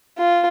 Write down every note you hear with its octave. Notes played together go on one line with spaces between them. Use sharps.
F4